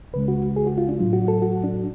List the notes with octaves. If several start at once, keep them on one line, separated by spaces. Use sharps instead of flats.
C#2 C#3 G#3 B4
F#4
G#4
F#4
F4
D4
A2 F#3 F4
F#4
A4
F#4
D4